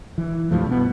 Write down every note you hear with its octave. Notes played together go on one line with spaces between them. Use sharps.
E3
C2 G2 F3 A3
B2 B3